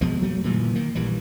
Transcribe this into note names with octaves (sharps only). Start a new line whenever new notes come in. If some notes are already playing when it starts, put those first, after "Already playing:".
F2 B2 F3 G#3
F#3 A3 A#3
F#1 A#2 D#3 E3
D#3 A#3
A#1 E3 G3